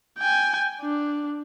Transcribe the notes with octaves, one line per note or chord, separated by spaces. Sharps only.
G5 G#5
D4